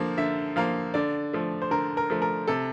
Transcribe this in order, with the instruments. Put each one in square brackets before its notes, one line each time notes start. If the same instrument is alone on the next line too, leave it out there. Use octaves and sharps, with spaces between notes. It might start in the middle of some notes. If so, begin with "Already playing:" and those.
Already playing: [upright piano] D3 F3 A#3
D3 E5
F3 A#3 F5
D3 D5
F3 A3
C5
D3 A#4
A#4
F3 A3
A#4
C3 A4